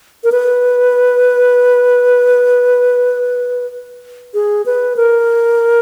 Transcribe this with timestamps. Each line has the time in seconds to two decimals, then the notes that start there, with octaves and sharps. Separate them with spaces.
0.24 A#4
0.32 B4
4.34 G#4
4.66 B4
4.97 A#4